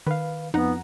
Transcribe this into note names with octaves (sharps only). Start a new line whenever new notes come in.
D#3 B4 F5
F2 B3 D#4 F#5 A#5